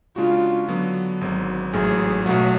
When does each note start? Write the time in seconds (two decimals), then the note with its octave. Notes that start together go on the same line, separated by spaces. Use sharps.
0.16 C#3 G#3 D4 F4 F#4
0.68 D3 F#3 B3 D4
1.21 G#1 G#2 F#3
1.73 A1 G#2 F#3 A3 G#4
2.26 B1 B2 F#3 A3 F#4